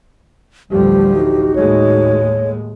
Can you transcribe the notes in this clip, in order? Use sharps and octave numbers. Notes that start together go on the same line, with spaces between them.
A1 D2 F3 G3 G4
D#4 F#4
D#2 A2 G#3 C#5